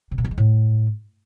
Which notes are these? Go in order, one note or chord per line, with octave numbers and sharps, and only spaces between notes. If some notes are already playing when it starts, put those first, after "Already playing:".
C3
A#2
D#3
G#3
A2